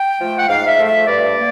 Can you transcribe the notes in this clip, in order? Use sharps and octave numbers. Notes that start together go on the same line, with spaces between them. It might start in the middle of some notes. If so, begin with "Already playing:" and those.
Already playing: G5
F3 A3
F#5
G#2 F5
E5
F3 A3
E5
G2 D5
A#3